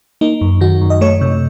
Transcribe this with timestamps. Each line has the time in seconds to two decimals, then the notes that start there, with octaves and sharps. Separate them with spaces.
0.21 A#3 D#4
0.41 F#2
0.61 D#3 F#4
0.81 F#2
0.90 D#5
1.01 A3 C#5
1.21 C3